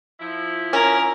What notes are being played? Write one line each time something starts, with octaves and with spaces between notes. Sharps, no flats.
F3 E4
C#4 A#4